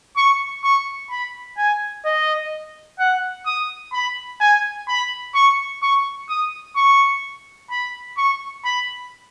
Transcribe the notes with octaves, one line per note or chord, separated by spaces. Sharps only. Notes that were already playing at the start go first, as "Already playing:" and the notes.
C#6
C#6
B5
G#5
D#5
F#5
D#6
B5
G#5
B5
C#6
C#6
D#6
C#6
B5
C#6
B5